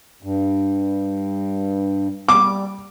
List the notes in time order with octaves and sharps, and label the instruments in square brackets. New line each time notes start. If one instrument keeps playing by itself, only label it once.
[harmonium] G2
[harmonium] G3 [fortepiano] D6